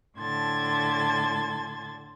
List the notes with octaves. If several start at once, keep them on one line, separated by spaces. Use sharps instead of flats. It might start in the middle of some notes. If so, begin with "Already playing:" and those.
A2 D3 A5 C6 G#6 A6